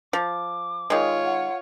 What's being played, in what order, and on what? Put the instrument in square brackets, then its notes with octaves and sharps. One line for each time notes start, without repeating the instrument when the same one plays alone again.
[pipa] F3 [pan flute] D6
[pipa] D#3 G#3 [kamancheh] F4 C#5
[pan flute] F#5